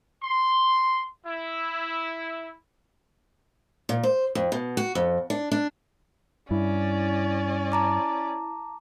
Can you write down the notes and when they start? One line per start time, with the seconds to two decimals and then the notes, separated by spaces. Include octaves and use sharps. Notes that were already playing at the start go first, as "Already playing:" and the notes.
0.23 C6
1.27 E4
3.89 A#2
4.03 C5
4.35 F2
4.52 B2
4.77 F#4
4.95 F2
5.30 D4
5.52 D4
6.51 G2 C#4 E4 D5
7.72 A5 A#5 D6